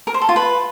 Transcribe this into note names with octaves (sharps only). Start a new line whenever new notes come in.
A#4
C5
A4
F4
B4